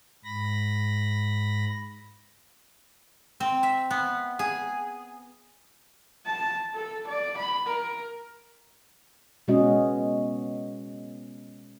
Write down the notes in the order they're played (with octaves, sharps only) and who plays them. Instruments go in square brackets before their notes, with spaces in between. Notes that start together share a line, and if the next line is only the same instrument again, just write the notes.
[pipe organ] G#2 B5 A#6
[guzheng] C4
E5
B3
G#4
[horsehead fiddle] A5
A4
D5
B5
A#4
[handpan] B2 G#3 B3 C#4 F#4 D#5